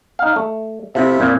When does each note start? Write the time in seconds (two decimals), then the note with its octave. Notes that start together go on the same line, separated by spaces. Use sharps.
0.19 D#4 F5
0.36 A3
0.95 C3 F3 A3 E4
1.19 F2 A#2